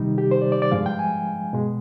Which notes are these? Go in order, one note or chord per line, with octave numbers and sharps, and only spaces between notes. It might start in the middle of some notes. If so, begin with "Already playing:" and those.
Already playing: C3 D#3 G3 D#4
G4
C5
D5
D5
D5
G2 F3 G#3 F5
G5
G#5
B2 G#3